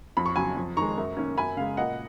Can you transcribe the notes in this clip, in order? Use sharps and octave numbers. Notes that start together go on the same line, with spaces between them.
F2 B5
C#6
C#3 F#3 G#5 B5
F2
D#3 G#3 A#5 C#6
F#2
D#3 A#3 C#4
F#2 G#5 B5
C#3 G#3 F5
A#2 D#5 F#5